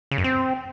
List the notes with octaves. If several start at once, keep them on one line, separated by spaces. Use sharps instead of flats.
C#3
F#2
C4